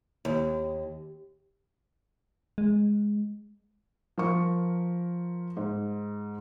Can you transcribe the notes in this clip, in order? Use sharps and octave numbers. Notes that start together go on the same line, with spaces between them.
D#2
G#3
F3 A#4 C#6
G#2